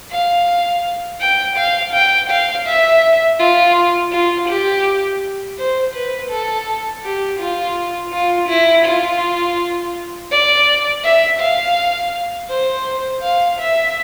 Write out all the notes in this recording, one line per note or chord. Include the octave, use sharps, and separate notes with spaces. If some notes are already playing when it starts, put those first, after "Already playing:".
F5
G5
F5
G5
F5
E5
F4
F4
G4
C5
B4
A4
G4
F4
F4
E4
F4
D5
E5
F5
C5
F5
E5